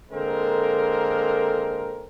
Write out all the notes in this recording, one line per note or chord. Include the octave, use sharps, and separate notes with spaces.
D3 G#3 A#3 C4 A4 A#4